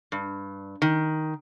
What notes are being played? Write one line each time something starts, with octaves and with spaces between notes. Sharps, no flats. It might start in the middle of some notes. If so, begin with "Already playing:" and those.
G2
D#3